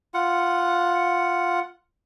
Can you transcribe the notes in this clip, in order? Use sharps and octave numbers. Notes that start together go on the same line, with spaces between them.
F4 F#5